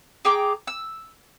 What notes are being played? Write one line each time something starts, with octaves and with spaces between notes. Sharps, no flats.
G#4 G5 A#5 D6
E6